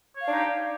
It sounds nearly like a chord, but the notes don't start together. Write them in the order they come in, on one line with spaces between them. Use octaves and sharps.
C#5 F5 D4 D#4 G4